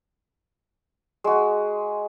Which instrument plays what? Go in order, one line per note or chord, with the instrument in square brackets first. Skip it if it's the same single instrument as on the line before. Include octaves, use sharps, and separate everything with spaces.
[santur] G#3 F#4